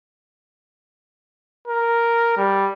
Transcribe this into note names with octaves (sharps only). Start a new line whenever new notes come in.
A#4
G3